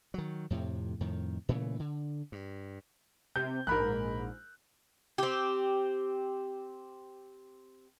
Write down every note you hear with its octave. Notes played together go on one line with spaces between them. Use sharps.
D#3 F#3
F2 A2 C3
F2 A2 D#3
A#2 C#3 E3 A3
D3
G2
C3 G6
A#1 G#2 A#4 B5 F#6
C4 G4